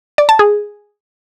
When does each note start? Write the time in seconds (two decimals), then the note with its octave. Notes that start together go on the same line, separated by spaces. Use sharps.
0.18 D5
0.29 A5
0.39 G#4